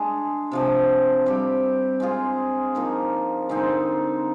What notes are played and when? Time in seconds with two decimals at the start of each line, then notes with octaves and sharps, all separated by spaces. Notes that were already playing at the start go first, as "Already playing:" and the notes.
Already playing: G#3 D4 G#4
0.51 C3 F3 G#3 D4
1.26 G3 C4 G4
2.00 G#3 C4 F4 G#4
2.75 F3 A#3 D#4
3.49 D3 G#3 C4 D#4